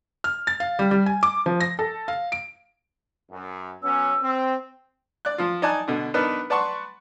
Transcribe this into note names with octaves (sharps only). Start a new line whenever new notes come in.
F6
A6
F5
G3
G3
G#5
D6
F3
A#6
A4
F5
D7
F#2
F#3 B3 C#4 E6
C4
D5 F#6
F3 F4
D#4 D5 G#5 A5 F#6
B2 D3
B3 D4 D#4 A#4 B4
B4 D5 F#5 A5 C6 C#6